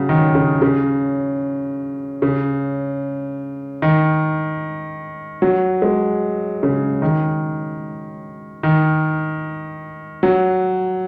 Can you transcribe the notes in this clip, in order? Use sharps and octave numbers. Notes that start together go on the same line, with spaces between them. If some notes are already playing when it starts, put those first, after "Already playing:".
Already playing: C#3 F#3
D#3
C#3
C#3
C#3
D#3
F#3
G#3
C#3
D#3
D#3
F#3